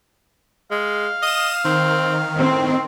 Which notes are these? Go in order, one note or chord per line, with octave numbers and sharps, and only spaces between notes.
G#3 F5
D#5 D#6 E7
D#3 C4
A2 C4